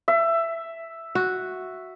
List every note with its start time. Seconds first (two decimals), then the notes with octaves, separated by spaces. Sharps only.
0.08 E5
1.15 F#4